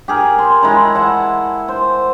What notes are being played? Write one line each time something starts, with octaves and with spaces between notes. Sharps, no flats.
G4 G#4 A#4
C6
G#3 E4 A#5 B5
E5 F#5 A5
C5